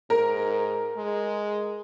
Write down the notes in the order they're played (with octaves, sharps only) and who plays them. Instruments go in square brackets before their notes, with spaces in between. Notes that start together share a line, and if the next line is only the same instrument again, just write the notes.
[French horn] G#2 [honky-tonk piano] A#4
[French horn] G#3